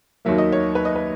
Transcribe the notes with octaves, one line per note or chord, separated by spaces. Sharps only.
D#2 D#3 F#3 A#3 E5
D#5
C#5
B4
D#5
B4